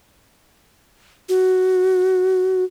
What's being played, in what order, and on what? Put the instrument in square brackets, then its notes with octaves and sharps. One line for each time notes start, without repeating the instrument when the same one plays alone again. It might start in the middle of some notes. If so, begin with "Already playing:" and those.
[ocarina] F#4